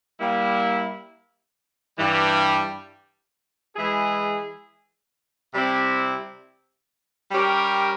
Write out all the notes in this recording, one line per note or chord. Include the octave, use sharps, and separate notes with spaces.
G3 A#3 E4
G2 E3 G3
E3 G#3 E4 G#4
C3 G3 C4 E4
G3 C#4 G4 A#4